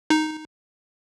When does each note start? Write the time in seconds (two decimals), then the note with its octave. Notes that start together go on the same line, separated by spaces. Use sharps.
0.10 D#4